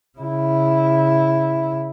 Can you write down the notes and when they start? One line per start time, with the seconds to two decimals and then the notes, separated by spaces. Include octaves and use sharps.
0.19 C#3 E4